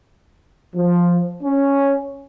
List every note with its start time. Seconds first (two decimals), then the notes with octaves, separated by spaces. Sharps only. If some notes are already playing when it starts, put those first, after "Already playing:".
0.75 F3
1.43 C#4